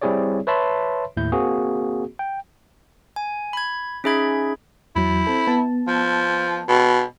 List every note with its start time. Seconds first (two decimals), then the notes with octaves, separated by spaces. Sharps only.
0.02 G3 C4 E4 G#4 C#5 D5
0.47 B4 C#5 E5 A5 B5 C6
1.17 D#2 A2 E4 G6
1.32 A#3 C4 F#4 G#4
2.19 G5
3.16 G#5
3.53 B5 G#6
4.04 C#4 D#4 G#4 E5 B5 G#6
4.96 E2 F#3 E4
5.27 C4 A4
5.47 B3 A5
5.87 F3
6.68 B2